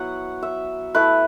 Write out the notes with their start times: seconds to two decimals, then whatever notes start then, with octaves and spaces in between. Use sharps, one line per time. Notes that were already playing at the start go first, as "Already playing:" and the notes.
Already playing: F#3 B3 E4 F#5
0.43 E5
0.95 A3 E4 B4